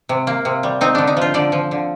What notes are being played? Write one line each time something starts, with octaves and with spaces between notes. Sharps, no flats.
C3
A#3
C3
G3
C4 D#4
D3 D4
D#4
F3 F4
D3 D5
F3
D3